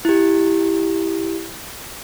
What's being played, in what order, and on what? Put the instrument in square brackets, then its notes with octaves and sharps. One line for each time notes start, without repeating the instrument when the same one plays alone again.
[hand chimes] E4 G4